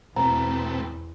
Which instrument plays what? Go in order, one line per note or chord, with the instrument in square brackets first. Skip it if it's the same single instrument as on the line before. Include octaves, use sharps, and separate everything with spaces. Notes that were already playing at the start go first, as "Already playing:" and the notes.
[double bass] E2 [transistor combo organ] B2 A3 [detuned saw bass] C4 [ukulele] A#5